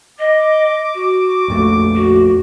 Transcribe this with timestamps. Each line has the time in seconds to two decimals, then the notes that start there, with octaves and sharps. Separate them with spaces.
0.19 D#5 D6
0.95 F#4
1.48 A#1 F2 A3
1.95 F#4